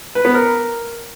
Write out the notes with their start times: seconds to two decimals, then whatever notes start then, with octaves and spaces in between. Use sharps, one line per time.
0.15 B4
0.25 B3
0.34 A#4